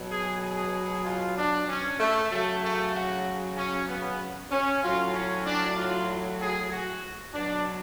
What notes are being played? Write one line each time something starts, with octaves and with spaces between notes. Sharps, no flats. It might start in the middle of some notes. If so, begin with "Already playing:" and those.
Already playing: B2 F#3
G#4
G#4
F4
D4
C#4
A3
C#3 F#3 A3
A3
F#4
C#4
B3
C#4
A2 F#3 F4
C#4
D4
F4
G#4
F#4
B2 F#3 D4